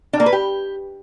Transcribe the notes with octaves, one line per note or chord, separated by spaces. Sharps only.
D4
A#3
B4
G4